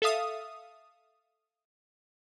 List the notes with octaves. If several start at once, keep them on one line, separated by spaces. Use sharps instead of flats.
A4 E5 F5 D#6